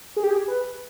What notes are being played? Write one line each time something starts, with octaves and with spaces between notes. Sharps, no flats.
G#4
G4
G#4
B4